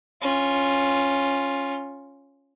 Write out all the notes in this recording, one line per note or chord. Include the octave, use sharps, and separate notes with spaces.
C#4 F4